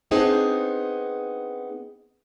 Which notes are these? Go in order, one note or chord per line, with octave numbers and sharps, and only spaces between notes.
B3 C4 D4 D#4 G#4 C5